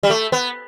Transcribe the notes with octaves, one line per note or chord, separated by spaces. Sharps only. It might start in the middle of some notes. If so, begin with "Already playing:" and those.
G3
A3
B3